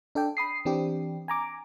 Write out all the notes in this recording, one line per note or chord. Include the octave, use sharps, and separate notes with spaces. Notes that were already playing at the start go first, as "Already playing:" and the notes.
D4 A4 D5 G5
B5 D#6 C7
E3 C4 D4 G4
G#5 A#5 D6